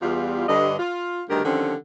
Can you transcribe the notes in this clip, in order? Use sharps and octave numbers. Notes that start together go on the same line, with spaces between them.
E2 G3 F4
G2 D3 D#5
F4
D2 G2 D#3 G4 A#4
D3 D#3 F3 G3 C4 C#4